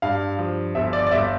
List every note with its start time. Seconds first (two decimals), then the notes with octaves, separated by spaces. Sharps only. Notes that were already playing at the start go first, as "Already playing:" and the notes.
0.02 G2 F5
0.39 F3
0.75 G1 E5
0.93 D5
1.07 D5
1.11 G1 E5